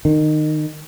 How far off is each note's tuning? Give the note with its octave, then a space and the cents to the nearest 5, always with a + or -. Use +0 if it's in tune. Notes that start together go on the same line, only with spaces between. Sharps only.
D#3 -20